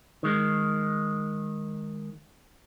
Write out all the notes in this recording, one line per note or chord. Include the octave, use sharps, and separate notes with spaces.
D#3 G#3